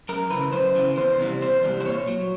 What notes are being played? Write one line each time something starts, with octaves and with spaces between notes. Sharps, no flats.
F#2 A#4
C#3 E3 B4
F#2 C5
C#3 E3
E2 C5
C3 E3 G3
E2 C5
C3 E3 G3
C5
A#2 C#5
F#3